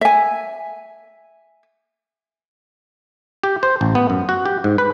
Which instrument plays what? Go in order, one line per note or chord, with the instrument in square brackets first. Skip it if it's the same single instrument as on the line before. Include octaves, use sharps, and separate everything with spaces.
[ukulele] E5 G#5
[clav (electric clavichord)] G4
C5
A1
B3
F#2
F#4
G4
G#2
B4